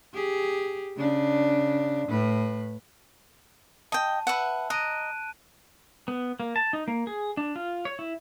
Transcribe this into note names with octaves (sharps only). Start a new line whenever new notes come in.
G4 G#4
C#3 D4
A2 B4
D#5 G5 A5
B4 E5 F#5
D#5 A#5 F#6 D7 D#7
B3
A#3
A5
D#4
A#3
G#4
D4
F4
C#5
E4